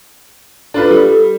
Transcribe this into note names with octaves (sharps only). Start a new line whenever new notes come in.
D4 F4 A4 B4
G3